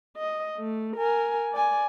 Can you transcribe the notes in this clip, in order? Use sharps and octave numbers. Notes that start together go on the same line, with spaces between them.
D#5
A3
A#4 G#5
D5 G#5